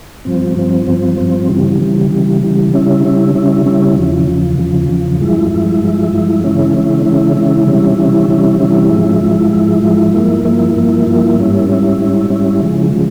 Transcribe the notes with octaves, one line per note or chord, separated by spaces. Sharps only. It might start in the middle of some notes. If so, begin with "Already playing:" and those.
G2 F3 C4
G2 F3 C4
G2 F3 C4
G2 F3 C4
C#3 E3 G3
C#3 E3 G3
C#3 E3 G3
C#3 E3 G3
C#3 G3 C#4 E4
C#3 G3 C#4 E4
C#3 G3 C#4 E4
C#3 G3 C#4 E4
E2 C#3 F3
E2 C#3 F3
E2 C#3 F3
E2 C#3 F3
G2 F3 G#3 E4
G2 F3 G#3 E4
G2 F3 G#3 E4
G2 F3 G#3 E4
C#3 E3 G#3 C#4 E4
C#3 E3 G#3 C#4 E4
C#3 E3 G#3 C#4 E4
C#3 E3 G#3 C#4 E4
C3 E3 G3 C#4 E4
C3 E3 G3 C#4 E4
C3 E3 G3 C#4 E4
C3 E3 G3 C#4 E4
G#2 F3 G#3 E4
G#2 F3 G#3 E4
G#2 F3 G#3 E4
G#2 F3 G#3 E4
G2 F3 A#3 E4
G2 F3 A#3 E4
G2 F3 A#3 E4
G2 F3 A#3 E4
G#2 G3 C#4 E4
G#2 G3 C#4 E4
G#2 G3 C#4 E4
G#2 G3 C#4 E4
C#3 F3 G#3
C#3 F3 G#3